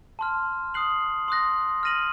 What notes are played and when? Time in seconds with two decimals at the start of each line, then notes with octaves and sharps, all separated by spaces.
0.19 A5 C6 F6
0.74 D#6 F#6 C7 F#7
1.28 C6 D#6 F#6 A#6
1.83 F6 A#6 D#7 F#7